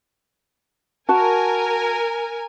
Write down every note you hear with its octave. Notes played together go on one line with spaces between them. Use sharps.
F#4 A#4 G#5 A5